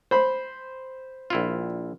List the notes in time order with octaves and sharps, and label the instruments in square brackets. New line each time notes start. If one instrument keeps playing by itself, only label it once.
[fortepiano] C5 B5
[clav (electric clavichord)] A#1 E4 F4